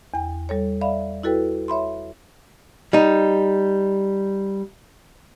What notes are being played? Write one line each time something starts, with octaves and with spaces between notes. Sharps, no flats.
E2 G5
G3 A4 C#5
D5 E5 F5 B5
E4 F#4 A4 B4 G5
C#5 E5 B5 C6
G3 D#4